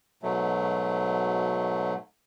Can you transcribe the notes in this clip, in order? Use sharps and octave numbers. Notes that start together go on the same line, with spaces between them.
G#2 B2 F#3 A3